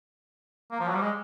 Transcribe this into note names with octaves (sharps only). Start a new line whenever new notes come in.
A#3
F3
F#3
G3
G#3